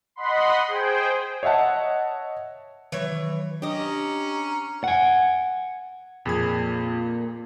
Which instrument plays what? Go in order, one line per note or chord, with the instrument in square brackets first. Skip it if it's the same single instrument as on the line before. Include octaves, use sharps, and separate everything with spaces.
[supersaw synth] D#5 F#5 B5 C6
G#4 C5 G5
[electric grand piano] C#5 D#5 E5 F#5 A5
[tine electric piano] D#3 F#3 [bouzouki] E3 C#5
[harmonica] C#4 A#5 [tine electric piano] D4 [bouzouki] G4 D#5
[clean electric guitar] F#5 G#5
[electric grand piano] F2 G#4 G#6 [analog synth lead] A#2